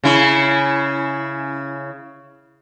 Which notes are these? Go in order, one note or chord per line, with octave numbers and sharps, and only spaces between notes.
C#3 E4